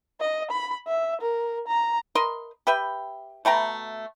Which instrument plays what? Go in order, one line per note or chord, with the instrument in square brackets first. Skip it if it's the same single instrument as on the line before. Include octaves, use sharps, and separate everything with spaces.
[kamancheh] D#5
B5
E5
A#4
A#5
[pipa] A#4 D#5 C6
G4 B4 E5 G5
B2 A3 G5 A#5